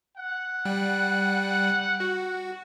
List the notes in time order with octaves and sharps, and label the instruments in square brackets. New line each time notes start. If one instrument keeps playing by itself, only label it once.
[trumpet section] F#5
[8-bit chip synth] G3 G5 F#6
F#4